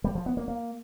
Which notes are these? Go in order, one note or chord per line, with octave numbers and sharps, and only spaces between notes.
G3
F3
B3
A#3
A#3